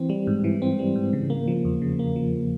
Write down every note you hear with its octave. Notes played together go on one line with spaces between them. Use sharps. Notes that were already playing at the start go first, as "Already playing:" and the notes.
Already playing: E3 C4
G3
G#2
E3
C4
G3
G#2
C#3
A#3
F3
E2
C#3
A#3
F3